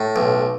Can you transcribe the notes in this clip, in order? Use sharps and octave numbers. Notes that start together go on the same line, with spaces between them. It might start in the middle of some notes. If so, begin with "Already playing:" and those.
Already playing: A2
B1